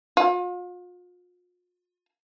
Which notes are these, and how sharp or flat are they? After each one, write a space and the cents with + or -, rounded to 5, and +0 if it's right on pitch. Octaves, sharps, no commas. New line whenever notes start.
F4 +40